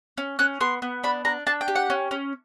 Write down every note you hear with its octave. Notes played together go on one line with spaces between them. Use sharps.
C#4
C#4 F#6
B3 C6
B3
D4 B5
D4 A#5
D4 A5
G5
G4
F#5
C#4
C#4